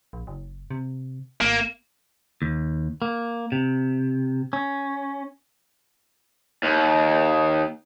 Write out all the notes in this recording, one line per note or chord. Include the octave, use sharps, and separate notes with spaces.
A#1
F#1
C3
G#1 A#3
D#2
A#3
C3
C#4
D#2